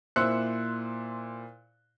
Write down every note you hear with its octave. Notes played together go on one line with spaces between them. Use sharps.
A#2 E4 C5 E6 F#6 C#7